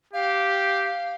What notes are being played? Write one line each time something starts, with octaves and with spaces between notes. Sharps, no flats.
G4 F5